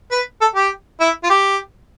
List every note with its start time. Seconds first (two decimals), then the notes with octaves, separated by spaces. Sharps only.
0.11 B4
0.41 A4
0.55 G4
1.00 E4
1.24 F4
1.30 G4